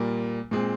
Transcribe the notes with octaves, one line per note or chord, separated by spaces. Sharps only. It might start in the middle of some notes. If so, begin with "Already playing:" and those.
Already playing: A#2 G3 A#3
A#2 G#3 C4